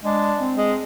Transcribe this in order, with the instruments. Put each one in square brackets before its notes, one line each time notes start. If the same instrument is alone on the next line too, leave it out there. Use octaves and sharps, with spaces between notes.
[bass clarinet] G#3 [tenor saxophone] D4
[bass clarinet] C4
[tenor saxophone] G#3